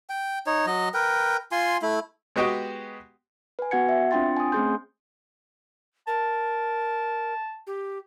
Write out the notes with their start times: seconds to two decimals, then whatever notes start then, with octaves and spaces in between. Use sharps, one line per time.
0.10 G5
0.47 D#4 C#5
0.66 F#3 D#5
0.94 A#4 B4 G5
1.52 F4 G#5 C6
1.82 A3 E4
2.36 G#3 B3 F#4 G4 D#5 G5
3.59 B4 G#5
3.71 B3 F#4 F#5 G#6 C#7
3.89 E5
4.11 C4 D4 F4 G5 C6 A6
4.37 G#5 D#6
4.52 A3 C4 C#4 G#4 C6 G6
6.07 A#4 A5
7.67 G4